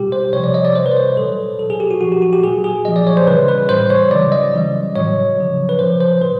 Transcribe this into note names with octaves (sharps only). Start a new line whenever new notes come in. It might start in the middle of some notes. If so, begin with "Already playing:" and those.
Already playing: B2 G3 G4
C5
C3 F3 C#5
D5
D#5
D5
C3 E3 G3 C5
B4
C5
C#5
A#2 F#3 A4
B2 F#3 A4
G#4
G4
F#4
A#2 F3 F#4
G4
F#4
G4
A#2 F#3 G#4
G#4
A#2 F3 D#5
D5
C#5
C5
C#3 E3 G3 B4
B4
A2 E3 G3 C5
C#5
C#3 F#3 D5
D#5
C#3 E3 G3
A2 F#3 C#5
C#3 F3
B4
A#2 F3 C5
C5
A2 F#3 B4